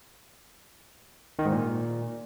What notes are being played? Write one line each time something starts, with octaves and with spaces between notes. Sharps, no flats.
D#3
G#2
A#2